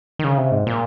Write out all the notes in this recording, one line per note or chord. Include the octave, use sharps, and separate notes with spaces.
D#3
C#3
C3
G#2
A#2